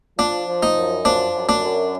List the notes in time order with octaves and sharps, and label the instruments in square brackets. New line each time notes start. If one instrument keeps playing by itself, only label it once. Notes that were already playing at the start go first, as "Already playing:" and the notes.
[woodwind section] F3 [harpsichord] D4
[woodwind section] F3
[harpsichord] D#4
[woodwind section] F#2
[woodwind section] F3 [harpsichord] D4
[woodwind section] F#2
[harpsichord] D4
[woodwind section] F#2